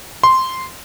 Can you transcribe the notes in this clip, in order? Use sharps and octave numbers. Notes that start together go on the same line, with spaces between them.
C6